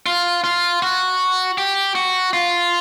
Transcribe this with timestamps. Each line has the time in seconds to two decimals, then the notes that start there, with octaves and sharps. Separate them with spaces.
0.06 F4
0.44 F4
0.82 F#4
1.58 G4
1.95 F#4
2.33 F4